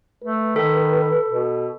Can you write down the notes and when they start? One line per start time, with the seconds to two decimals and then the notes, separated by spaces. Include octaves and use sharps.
0.24 A3 B4
0.56 D#3 A4
1.29 B2